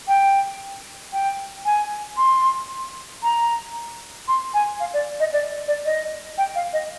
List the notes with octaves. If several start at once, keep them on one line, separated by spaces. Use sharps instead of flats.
G5
G5
G#5
C6
A#5
C6
G#5
F5
D5
D#5
D5
D5
D#5
G5
F5
D#5